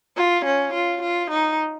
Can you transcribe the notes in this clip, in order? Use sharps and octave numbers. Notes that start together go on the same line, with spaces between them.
F4
C#4
F4
F4
D#4